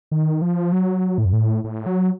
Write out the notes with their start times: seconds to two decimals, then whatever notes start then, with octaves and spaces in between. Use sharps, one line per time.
0.11 D#3
0.42 F3
0.72 F#3
1.18 A2
1.25 F#2
1.33 A2
1.64 A2
1.86 F#3